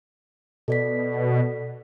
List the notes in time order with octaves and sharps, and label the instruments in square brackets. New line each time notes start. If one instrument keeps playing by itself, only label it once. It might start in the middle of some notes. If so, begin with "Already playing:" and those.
[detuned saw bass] B2 [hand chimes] A4 D5 B6